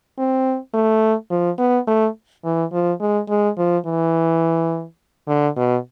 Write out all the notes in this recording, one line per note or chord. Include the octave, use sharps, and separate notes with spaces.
C4
A3
F3
B3
A3
E3
F3
G#3
G#3
F3
E3
D3
B2